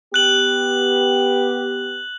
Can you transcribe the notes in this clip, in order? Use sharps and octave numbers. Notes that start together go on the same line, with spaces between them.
B3 G4 F#6 F#7